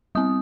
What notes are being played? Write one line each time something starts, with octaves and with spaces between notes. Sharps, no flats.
G3 C4 D#6